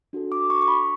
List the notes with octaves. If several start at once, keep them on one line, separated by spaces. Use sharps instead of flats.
D4 F#4 A4
D6
C#6
C#6
B5